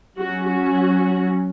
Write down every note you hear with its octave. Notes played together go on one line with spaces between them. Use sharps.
F#3 C#4 F#4
F#4